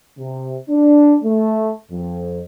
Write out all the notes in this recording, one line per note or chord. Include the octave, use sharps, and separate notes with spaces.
C3
D4
A3
F2